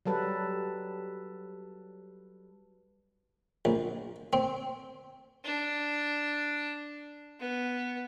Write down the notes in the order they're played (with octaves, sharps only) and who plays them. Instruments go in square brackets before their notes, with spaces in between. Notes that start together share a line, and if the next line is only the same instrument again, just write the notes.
[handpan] F#3 G3 A4 B4
[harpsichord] A#1
C4
[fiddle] D4
B3